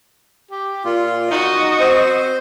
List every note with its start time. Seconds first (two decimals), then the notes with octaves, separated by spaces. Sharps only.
0.51 G4
0.85 A#2 F4
1.31 D#4 F#4 D#5
1.80 C4 C5